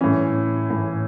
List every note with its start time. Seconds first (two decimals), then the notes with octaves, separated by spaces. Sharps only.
0.01 A2 E3 C#4
0.70 A2 E3